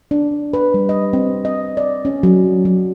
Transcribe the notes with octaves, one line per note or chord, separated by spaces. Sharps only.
D4
B4
G3
D#5
C4
D#5
D5
C#4
F#3
F#3